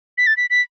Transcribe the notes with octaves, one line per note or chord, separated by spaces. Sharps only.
B6
A6
B6
B6